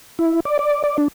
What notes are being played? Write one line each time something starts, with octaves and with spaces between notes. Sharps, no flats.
E4
D5
D5
D5
D4